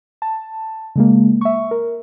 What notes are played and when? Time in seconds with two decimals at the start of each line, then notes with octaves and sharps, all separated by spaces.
0.22 A5
0.96 C#3 G#3 A#3
1.41 E5 C#6
1.71 A#4